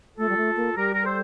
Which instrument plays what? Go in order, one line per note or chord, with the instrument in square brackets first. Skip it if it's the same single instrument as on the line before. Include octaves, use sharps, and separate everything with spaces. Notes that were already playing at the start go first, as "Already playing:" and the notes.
[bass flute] A3 [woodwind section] F4 A4
[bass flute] G3
A3
A#3
[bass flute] G3 [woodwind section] G4 A#4
[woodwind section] A#4
A4 C5